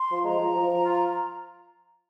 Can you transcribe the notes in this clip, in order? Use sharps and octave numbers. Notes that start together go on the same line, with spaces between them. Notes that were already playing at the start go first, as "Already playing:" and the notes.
Already playing: C6
F3
G#3 A#5
F3
F3
F3
F4